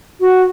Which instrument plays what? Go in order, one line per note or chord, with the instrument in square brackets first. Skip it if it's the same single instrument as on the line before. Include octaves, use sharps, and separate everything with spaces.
[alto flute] F#4